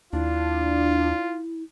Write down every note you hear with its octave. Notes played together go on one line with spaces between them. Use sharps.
D#2 D4 E4 F4